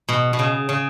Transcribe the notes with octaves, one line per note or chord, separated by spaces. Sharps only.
B2
B2
C#3
C#3